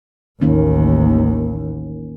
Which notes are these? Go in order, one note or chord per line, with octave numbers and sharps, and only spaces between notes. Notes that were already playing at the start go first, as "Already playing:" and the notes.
A1 D#2 D#3 A#3 C#4